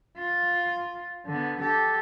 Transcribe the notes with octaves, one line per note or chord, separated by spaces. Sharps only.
F4
D3 B3
G4 A4